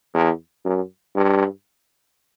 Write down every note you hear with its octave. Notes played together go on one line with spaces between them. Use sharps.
E2
F#2
G2